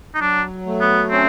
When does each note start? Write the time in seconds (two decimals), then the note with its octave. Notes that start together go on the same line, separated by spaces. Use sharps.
0.15 D#4
0.20 F#3 D4
0.66 A3
0.81 B3
1.10 C4 C#4